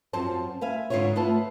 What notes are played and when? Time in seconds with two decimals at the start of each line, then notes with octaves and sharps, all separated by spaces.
0.13 F#2 F3 C4 C5 A5
0.61 B4 E5 F5 G#5
0.90 G#2 B2 D3 F4 C#5
1.15 A3 B3 F4 B4 E5 A5